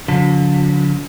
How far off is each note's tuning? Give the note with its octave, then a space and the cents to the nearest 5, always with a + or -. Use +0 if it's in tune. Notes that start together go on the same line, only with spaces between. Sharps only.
D3 -45 F3 +40